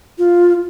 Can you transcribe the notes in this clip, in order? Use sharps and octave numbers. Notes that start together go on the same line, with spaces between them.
F4